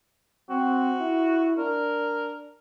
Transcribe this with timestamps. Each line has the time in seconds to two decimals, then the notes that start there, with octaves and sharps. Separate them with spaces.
0.50 C4 F#4
1.00 E4
1.58 D4 A#4